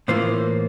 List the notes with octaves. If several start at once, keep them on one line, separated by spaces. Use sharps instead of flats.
A2 E3 A#3 F4 C5